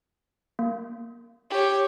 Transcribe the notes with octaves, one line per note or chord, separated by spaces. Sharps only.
A#3
G4 C#5